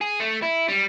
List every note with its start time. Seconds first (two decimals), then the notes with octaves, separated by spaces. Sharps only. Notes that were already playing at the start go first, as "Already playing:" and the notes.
0.01 G#4
0.20 A3
0.42 E4
0.68 G3